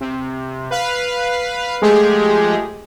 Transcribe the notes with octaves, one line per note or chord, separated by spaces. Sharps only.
C3
B4 F5
F3 G#3 A3 G4 G#4